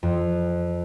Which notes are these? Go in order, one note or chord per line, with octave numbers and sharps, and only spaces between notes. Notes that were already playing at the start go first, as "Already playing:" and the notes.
F2